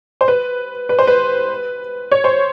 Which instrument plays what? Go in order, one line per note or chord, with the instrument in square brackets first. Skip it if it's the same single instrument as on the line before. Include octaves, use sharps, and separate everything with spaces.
[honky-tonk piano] C5
B4
B4
C5
B4
C#5
C5